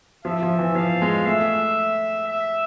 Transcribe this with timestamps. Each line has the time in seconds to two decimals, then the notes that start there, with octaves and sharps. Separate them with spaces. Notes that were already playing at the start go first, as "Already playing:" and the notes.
0.25 F3 E5
0.43 F3
0.59 E3
0.75 F3 F5
1.02 G#3
1.26 A3 E5
2.29 E5